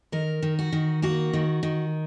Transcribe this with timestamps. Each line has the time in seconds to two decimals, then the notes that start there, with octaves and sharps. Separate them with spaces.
0.12 D#3 A#4
0.42 D#3
0.59 F#4
0.72 D#3
1.02 A#3 F#4
1.33 D#3
1.63 D#3